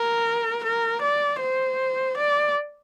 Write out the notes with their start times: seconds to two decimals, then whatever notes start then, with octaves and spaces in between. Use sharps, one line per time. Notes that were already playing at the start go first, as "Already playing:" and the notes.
Already playing: A#4
0.64 A#4
1.02 D5
1.40 C5
2.17 D5